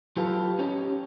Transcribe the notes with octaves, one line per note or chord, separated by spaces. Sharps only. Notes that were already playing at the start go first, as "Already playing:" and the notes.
F#3 F4 G4 A4 B4 F5
C#4 D#4 G4 C#5